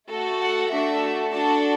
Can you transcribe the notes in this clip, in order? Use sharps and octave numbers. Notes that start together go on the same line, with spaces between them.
A3 F#4 A4
F#5
A3 D4 F#4 A4 E5
D4 F#4 A4 A5